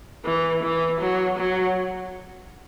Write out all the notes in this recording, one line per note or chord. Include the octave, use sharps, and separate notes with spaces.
E3
E3
F#3
F#3